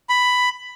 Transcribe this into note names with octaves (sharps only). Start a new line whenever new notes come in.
B5